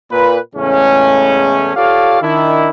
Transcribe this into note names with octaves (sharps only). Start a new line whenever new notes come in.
A#2 B4
E2 A2 C#3 G#3 A3 C#4
F4 G4 A4 C#5 D5 F5
D#3 D4 E4